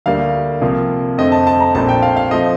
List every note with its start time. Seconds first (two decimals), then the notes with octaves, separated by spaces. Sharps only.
0.06 D2 D3 G3 A#3 F5
0.61 C2 C3 F3 A#3
1.18 F2 D3 A3 C4 D#5
1.32 A5
1.47 A5
1.60 A#5
1.75 A#1 A#2 A3 C4 A5
1.89 G5
2.02 F5
2.17 F5
2.31 F3 A3 C4 D#5